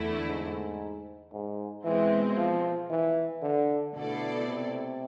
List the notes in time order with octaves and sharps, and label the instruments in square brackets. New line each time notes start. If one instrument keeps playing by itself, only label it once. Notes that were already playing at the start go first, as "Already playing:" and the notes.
Already playing: [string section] E2 D3 A3 E4
[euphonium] G#2
G#2
[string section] B2 G#3 C4 [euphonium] E3
[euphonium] F3
E3
D3
[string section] B2 A3 E4 A4 D5 [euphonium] D3
[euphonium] C3